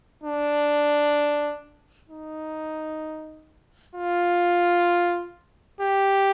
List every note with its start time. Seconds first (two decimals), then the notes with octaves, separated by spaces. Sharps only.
0.24 D4
2.10 D#4
3.95 F4
5.81 G4